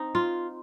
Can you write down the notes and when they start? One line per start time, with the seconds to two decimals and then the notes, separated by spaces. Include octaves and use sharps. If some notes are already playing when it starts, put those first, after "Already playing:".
Already playing: C4 D#4
0.15 F4